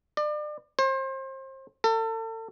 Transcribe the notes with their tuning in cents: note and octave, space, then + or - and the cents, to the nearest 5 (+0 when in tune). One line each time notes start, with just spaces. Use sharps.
D5 +35
C5 +30
A4 +35